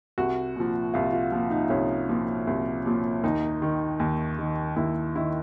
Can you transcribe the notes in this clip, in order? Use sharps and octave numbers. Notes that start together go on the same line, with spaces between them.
C2 F#4
A#2 F3
C2 F4
F4
A#2 F3
D#4
C2 C#4
A#2 F3
C2
A#2 F3
D#2 D#4
D#3
D#2
D#3
D#2 E4
D#3 E4